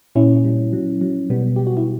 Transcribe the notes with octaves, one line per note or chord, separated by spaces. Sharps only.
A#2 C#4 E4
G3
F#3
F#3
B2 G3 B3
G3 G4
F#4
E4